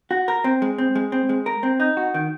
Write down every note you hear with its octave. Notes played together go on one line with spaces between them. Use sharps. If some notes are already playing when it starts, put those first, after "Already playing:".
F#4
A#4
C4
G#3
C4
G#3
C4
G#3
A#4
C4
D#4
F#4
D#3